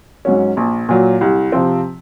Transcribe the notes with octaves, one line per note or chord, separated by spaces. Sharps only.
G#2 F#3 C#4
A#1
A#2 F#3
C2
C3 F3 C4